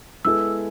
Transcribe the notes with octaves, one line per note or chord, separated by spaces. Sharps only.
G#3 B3 E4 A4 E6